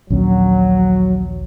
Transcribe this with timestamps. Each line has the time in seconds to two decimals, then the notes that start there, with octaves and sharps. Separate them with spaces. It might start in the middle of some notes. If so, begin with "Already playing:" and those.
0.10 A#1 D#2 F#3 C#4